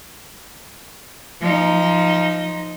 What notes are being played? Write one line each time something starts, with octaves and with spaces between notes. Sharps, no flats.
F3 D#4